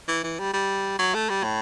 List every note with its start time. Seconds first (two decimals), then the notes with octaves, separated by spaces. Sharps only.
0.08 E3
0.24 E3
0.39 G3
0.54 G3
0.99 F#3
1.15 A3
1.30 G3
1.44 A2